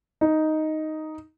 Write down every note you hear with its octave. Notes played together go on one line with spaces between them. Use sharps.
D#4